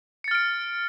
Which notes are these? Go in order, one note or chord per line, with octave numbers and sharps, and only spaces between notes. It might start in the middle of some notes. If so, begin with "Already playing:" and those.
F6 A6 C#7 D7